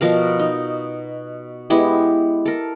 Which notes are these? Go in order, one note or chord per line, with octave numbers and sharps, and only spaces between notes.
B2 F3 A#4 F5
D#4
G#3 B3 E4 G4
A4 A#4